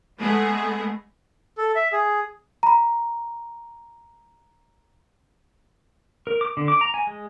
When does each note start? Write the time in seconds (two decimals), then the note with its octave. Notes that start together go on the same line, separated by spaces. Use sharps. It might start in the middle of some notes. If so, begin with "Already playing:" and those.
0.18 G#3 A3 B3 G#4
1.58 A4
1.76 E5
1.93 G#4
2.63 A#5 B5
6.27 A#4
6.41 D6
6.57 D3
6.68 D6
6.81 A#5
6.94 G#5
7.07 G#3